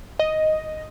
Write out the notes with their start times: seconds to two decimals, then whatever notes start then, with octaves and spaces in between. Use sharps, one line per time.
0.19 D#5